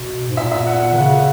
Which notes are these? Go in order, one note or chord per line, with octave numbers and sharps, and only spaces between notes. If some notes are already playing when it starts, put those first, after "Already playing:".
Already playing: B2
G#2
A#2 E5
E5
F#5
F#5
D#3
C#3 F#5